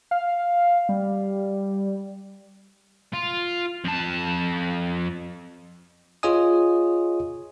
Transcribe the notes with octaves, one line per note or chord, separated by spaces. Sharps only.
F5
G3
F4
F2 A5
F4 G#4 C#5 D#5 G#5 D#6